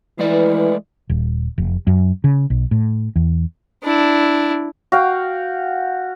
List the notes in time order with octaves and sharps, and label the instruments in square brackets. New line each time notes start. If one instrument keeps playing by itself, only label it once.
[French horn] E3 [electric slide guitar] G#3 A3 D5 [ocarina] B4
[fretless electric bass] D#1
F1
F#2
C#3
B1
A2
E2
[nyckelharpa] D4 E4
[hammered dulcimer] F#4 F5 G5